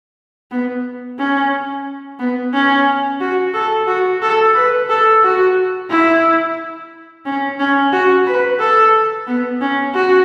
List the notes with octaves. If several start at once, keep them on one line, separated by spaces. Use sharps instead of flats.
B3
C#4
B3
C#4
F#4
A4
F#4
A4
B4
A4
F#4
E4
C#4
C#4
F#4
B4
A4
B3
C#4
F#4